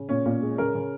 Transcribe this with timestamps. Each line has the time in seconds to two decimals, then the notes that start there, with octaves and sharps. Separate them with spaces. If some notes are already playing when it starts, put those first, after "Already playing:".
Already playing: C#3
0.09 A#2 C#4
0.26 A#2
0.42 G#3
0.58 C#3 A#4
0.75 C#3